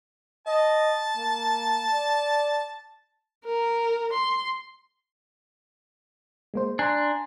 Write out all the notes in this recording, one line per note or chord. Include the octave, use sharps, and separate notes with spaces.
D#5 A5
A#3
D5
A#4
C6
G#3 A#3 C5
D4 G#5 A#5 C6